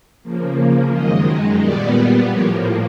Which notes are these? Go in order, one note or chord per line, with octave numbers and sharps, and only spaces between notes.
C#3 F3 A#3
F#2 D#3 G#3 D#5
A#2 G3 B3 D5
A2 F3 A#3 C#5